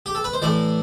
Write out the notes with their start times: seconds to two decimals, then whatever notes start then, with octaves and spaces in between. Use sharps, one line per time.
0.06 G4
0.15 A4
0.24 B4
0.33 C5
0.42 A2 E3 A3 D5